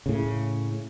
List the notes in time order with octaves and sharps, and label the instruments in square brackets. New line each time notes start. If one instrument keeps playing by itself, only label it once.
[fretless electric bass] A2 C#3